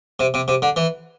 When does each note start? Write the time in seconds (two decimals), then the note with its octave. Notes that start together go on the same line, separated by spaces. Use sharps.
0.20 C3
0.34 C3
0.48 C3
0.62 D3
0.76 E3